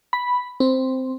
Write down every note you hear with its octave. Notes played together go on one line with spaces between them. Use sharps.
B5
C4